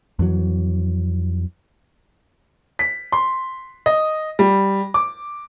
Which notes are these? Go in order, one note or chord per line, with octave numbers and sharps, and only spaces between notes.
F2 E3 F#3
B6
C6
D#5
G3
D6